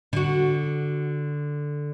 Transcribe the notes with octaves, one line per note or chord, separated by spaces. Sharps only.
D3 F#4